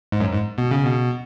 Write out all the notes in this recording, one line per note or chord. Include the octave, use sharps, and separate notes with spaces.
G#2
F#2
G#2
B2
C#3
B2